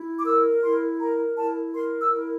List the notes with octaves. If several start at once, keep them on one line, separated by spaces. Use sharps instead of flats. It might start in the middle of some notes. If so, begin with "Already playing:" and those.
Already playing: E4
D6
A#4 E6
E4 C6
A#4 A#5
E4 A5
A#4 C6
E6
E4